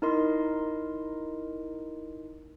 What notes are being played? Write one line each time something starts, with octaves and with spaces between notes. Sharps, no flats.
D#4 E4 A#4 D#5 C6